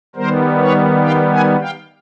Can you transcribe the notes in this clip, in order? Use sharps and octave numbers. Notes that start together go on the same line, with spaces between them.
D#3 G3 B3 A#4 C5
B4 C#5
F5 G5
F#5 G#5
F5 G5